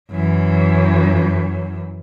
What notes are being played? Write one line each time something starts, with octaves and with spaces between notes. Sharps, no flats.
F#2 E3